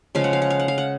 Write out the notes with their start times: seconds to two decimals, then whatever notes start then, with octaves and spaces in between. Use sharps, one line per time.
0.15 C#3 F3 G#3 F5
0.24 F#5
0.33 F5
0.42 F#5
0.50 F5
0.59 F#5
0.68 F5
0.78 F#5